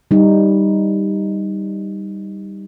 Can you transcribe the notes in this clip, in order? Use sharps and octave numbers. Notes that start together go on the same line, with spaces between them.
G3 D#4